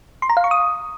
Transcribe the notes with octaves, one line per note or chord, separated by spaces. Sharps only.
C6
A#5
F5
C#6
D#6